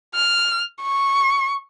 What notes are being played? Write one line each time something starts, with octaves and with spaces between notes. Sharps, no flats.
F6
C#6